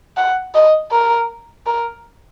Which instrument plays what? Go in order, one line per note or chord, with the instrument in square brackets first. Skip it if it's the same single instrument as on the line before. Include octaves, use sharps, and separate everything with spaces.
[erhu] F#5
D#5
A#4
A#4